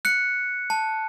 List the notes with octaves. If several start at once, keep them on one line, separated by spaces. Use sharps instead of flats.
F#6 C#7
A5